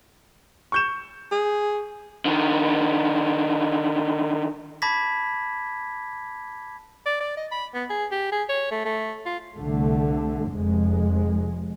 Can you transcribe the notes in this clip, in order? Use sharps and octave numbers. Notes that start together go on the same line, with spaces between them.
C#6 G6 E7
G#4
D3 D#3
A5 B5 D6 G#6 A#6 B6
D5
D5
D#5
B5
B3
G#4
G4
G#4
C#5
A3
A3
F4
C2 D3 A3
F1 F2 G#3